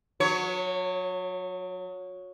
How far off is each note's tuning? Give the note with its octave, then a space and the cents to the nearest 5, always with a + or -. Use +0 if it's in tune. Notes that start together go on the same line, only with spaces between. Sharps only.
F#3 -35 C#5 +0